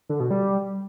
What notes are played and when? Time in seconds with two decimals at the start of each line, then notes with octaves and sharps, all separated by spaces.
0.09 D3
0.20 B2
0.31 G3